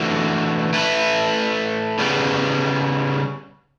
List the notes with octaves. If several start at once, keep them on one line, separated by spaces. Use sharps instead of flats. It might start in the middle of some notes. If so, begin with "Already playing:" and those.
Already playing: E3 A3 D4 F#4
A3 E4 B4
C#3 G3 B3